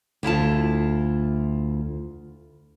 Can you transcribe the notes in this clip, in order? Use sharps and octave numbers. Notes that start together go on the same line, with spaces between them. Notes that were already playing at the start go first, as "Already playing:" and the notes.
D2 E4 F4 A5